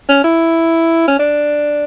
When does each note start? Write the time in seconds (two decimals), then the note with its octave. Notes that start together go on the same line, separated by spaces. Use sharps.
0.09 C#4
0.24 E4
1.08 C#4
1.19 D4